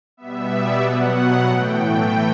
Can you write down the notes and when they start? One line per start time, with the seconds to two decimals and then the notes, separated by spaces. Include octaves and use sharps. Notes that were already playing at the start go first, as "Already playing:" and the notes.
0.17 B2 G3 B3 E5
0.49 D5
0.82 B2 F#3 B3 F#5
1.47 A2 E3 A3 G5
1.80 G5